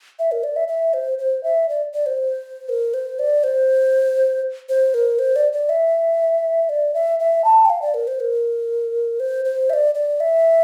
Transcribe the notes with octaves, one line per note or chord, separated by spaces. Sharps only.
E5
A#4
D5
E5
E5
C5
C5
E5
D5
D5
C5
A#4
C5
D5
C5
C5
A#4
C5
D5
D5
E5
D5
E5
E5
A5
G5
F5
D5
A#4
C5
A#4
C5
C5
E5
D5
D5
E5